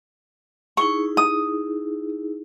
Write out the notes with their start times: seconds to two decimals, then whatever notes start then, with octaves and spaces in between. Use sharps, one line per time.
0.77 D#4 E4 G#4 C#6
1.17 D#6